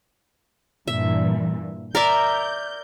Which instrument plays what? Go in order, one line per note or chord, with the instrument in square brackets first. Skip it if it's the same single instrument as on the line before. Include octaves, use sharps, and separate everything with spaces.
[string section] G2 A#2 E3 [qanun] E5
[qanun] A#4 D5 E5 [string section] G6